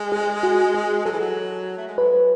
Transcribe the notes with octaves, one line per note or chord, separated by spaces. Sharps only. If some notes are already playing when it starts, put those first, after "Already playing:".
Already playing: G#3
G#4
F#4
G#4
F#3 A4
E3
F#3
A3
G#3
F#3 B4